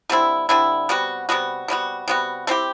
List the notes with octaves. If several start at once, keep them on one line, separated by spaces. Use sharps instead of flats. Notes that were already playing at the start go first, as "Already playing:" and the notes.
D3 G3 C4 E4
D3 G3 C4 E4
C3 G3 B3 F#4
C3 G3 B3 F#4
C3 G3 B3 F#4
C3 G3 B3 F#4
A3 C4 E4 G4